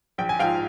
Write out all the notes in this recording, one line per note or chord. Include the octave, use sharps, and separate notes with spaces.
A#1 G5
G#5
G#2 F3 F5 G5